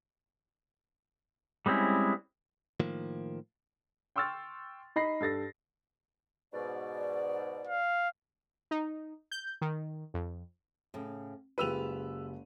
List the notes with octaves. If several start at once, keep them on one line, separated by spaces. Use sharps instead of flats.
G3 G#3 C4 C#4 E4
A2 D#3 F3 A#3
G5 C6 C#6 E6 F6 A6
D#4 D#5 B5 A#6 C7
G2 A4 A6 A#6
G#2 B2 D5
F5
D#4
G6
D#3
F2
A2 C#3
F#1 G#3 F4 G4 B4 E6 D#7 F7